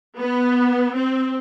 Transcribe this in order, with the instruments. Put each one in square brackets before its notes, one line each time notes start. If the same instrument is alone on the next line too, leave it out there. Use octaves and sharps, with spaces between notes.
[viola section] B3
C4